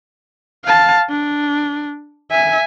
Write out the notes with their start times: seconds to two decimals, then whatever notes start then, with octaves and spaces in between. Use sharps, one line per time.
0.65 F5 A5
1.09 D4
2.31 E5 G#5